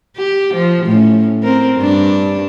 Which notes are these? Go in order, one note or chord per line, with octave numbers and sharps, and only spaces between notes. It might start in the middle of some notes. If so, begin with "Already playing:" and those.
G4
F3
A2 C#4
C4 A#4
G2 D4